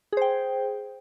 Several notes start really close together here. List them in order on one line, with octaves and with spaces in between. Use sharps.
G#4 C5 G5